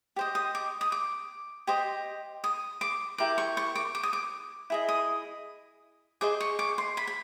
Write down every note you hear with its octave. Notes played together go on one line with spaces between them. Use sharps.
G4 C5 D#5
D#6
D6
D#6
D6
G4 C5 D#5
D#6
D6
E4 G4 A#4 D6
C#6
C#6
D6
D6
D#6
D6
E4 G#4 D#5
D#6
G#4 C5 D#5 D6
C#6
D6
C6
B5
B5